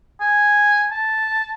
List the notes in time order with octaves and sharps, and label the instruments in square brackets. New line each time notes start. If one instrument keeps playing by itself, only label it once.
[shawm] G#5
A5